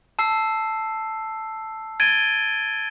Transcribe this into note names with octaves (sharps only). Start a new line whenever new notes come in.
A5 E6 C7
G#6 A6 D7 D#7 G7